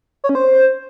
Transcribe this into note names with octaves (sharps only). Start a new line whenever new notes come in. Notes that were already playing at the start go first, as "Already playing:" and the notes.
C#5
C#4
C5